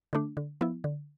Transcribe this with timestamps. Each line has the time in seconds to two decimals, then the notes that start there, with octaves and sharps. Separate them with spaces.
0.13 D3 A3 D4
0.37 D3
0.61 F3 B3 E4
0.84 D3